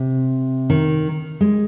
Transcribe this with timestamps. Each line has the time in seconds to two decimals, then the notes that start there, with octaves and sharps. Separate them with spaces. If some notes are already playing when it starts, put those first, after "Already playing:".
Already playing: C3
0.70 D#3
1.41 G#3